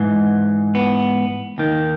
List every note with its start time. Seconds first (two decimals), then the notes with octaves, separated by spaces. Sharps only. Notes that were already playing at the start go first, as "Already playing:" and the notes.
Already playing: G#2 E3
0.75 B3
1.58 D#2 D#3